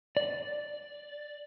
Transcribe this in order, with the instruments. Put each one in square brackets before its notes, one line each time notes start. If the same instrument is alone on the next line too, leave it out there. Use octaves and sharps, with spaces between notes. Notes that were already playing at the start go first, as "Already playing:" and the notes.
[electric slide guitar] D5